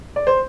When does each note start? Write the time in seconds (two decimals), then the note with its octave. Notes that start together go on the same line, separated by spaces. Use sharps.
0.16 D5
0.27 C5